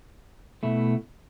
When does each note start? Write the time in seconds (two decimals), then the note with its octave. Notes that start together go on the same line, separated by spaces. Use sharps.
0.63 B2 A3 E4